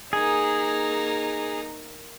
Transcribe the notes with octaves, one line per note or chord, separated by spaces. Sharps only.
A#3 D#4 G#4